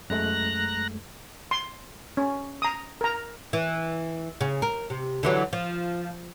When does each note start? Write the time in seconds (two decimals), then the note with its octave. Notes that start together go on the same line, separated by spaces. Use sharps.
0.10 F#2 G#3 A3 A#5 F#6 A#6
1.51 C6
2.17 C#4
2.62 A#5 D#6
3.01 A#4 A#5
3.53 E3
4.41 C#3
4.62 A#4
4.90 C3
5.23 D3 E3 F#3
5.53 F3